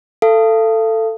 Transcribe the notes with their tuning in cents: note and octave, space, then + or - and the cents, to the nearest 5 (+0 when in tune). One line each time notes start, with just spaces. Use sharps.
A4 +15 F5 -35